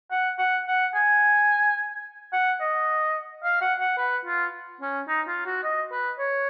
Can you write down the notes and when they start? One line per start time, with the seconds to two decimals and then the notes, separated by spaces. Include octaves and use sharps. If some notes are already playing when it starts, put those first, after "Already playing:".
0.11 F#5
0.39 F#5
0.68 F#5
0.95 G#5
2.33 F#5
2.61 D#5
3.44 F5
3.61 F#5
3.80 F#5
3.98 B4
4.26 F4
4.81 C#4
5.08 D#4
5.28 F4
5.46 F#4
5.64 D#5
5.92 B4
6.19 C#5